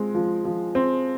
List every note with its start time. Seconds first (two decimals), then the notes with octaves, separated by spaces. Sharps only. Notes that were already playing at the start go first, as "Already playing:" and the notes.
Already playing: F3 G#3 C4
0.15 F3
0.45 F3
0.75 C4